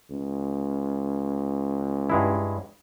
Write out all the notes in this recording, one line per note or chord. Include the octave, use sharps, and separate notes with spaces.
C#2
G2 G#3 E4